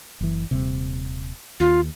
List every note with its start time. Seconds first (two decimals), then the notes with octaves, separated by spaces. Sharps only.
0.21 F#1 E3
0.51 D#1 C3
1.60 D#2 F4